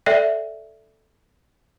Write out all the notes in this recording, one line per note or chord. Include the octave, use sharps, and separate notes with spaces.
A4 D5 E5 G5